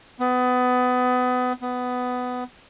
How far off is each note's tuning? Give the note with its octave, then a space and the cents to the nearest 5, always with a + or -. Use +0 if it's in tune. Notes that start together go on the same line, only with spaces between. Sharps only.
B3 +25
B3 +15